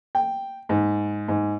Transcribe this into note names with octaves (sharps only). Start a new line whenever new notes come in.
G5
G#2
G#2